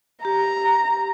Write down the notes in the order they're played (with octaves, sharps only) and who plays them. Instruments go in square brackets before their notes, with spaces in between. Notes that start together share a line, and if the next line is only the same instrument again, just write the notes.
[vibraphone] G4 [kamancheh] A#5